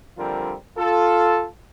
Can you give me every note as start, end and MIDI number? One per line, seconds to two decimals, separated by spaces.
0.17 0.55 50
0.17 0.55 53
0.17 0.55 55
0.17 0.55 60
0.17 0.55 65
0.17 0.55 70
0.77 1.45 65
0.77 1.45 69